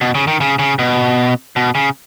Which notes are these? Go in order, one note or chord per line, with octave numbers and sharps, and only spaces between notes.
B2
C#3
D#3
C#3
C#3
B2
B2
C#3